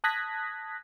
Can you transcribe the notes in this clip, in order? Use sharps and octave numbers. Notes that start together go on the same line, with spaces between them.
A5 D#6 F#6 G#6 A#6 B6